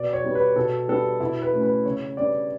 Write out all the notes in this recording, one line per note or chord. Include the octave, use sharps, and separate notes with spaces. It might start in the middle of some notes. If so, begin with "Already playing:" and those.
Already playing: B2 D5
C#5
G3 B3
B4
B2 A4
G3 B3 D4 A4
B2 E4
B4
A3 C#4
B4
C#3 C#5
G3 B3 D4 D5